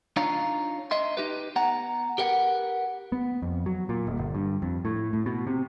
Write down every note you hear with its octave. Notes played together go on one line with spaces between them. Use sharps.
D4 D#4 F4 C#5 F5 A#5
D#5 E5 C6
D#4 G4 B4
B3 F#5 A#5
G4 A#4 B4 F#5
B3
F2
F#3
A#2
D#1
G1
G2
F2
A2
A2
B2
C3